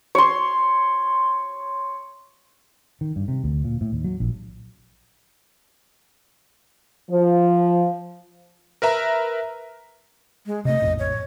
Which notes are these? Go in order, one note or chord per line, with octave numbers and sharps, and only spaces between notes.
C#5 C6
D#3
G2
C3
D2
A#2
A2
D#2
F#3
A#1
F3
A#4 B4 E5 A#5
G#3
C3 A3 D#5
A#1 F2 A2
C#5